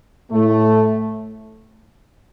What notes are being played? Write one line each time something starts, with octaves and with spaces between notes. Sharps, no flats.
A2 A3